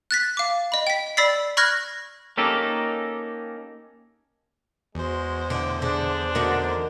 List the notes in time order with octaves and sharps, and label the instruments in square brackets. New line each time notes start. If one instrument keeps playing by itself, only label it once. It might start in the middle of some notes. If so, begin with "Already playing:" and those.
[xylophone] F#6 A6 B6
F5 D6
D#5 B5
G5 B6
D5 B5 E6 A6 B6 C7
B5 C#6 F6 F#6 G#6 A#6
[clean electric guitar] A#3 C#4 D#4 G4 A4
[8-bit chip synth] E2 C5 [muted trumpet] G#3 [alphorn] F#4
[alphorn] A2 [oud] D3
[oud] D3 [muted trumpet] D4 [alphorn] G#4
[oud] D3 D#4 F#4 [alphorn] A#4